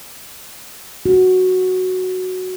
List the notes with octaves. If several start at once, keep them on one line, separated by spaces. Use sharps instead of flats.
F#4